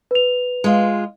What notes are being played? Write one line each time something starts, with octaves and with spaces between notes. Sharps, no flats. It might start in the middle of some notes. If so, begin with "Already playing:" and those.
B4 F7
G#3 F4